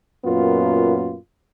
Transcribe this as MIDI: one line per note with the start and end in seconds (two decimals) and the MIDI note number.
0.25 1.16 42
0.25 1.16 46
0.25 1.16 59
0.25 1.16 65